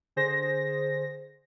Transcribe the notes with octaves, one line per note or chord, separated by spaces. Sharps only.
D3 G#4 C5 A#6